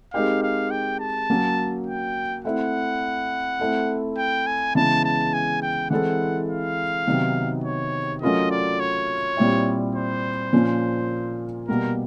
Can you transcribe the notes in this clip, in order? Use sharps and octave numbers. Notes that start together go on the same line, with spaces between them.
G#3 C4 D#4 G4 A#4 F5
F5
G5
A5
F#3 A#3 C#4 F#4
G5
A3 C4 E4 F#5
A3 C4 E4 A4
G5
G#5
C#3 E3 G#3 B3 A5
A5
G#5
G5
E3 G#3 C4 E4 A4 F#5
F5
C3 D#3 F#3 B3
C#5
F#3 A3 C#4 F4 A#4 D#5
D5
C#5
A#2 G3 C4 E4
C5
A#2 F3 A#3 C#4 F4
B2 G3 A#3 A#4